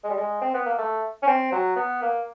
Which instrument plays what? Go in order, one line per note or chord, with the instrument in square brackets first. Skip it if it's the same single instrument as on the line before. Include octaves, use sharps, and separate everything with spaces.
[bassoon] G#3
G3
G#3
C4
B3
A#3
A3
C#4
C4
F#3
B3
A#3